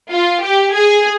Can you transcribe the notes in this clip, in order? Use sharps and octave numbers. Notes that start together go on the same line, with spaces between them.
F4
G4
G#4